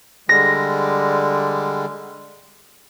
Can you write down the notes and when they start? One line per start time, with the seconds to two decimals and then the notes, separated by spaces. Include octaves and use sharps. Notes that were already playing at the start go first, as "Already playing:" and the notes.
0.29 D3 G3 G#3 A#6